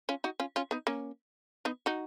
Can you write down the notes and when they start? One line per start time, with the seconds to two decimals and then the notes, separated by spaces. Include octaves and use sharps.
0.09 C#4 F4
0.24 D#4 F#4
0.40 C#4 F4
0.56 C#4 F4
0.71 B3 D#4
0.87 A#3 C#4
1.65 B3 D#4
1.86 D#4 F#4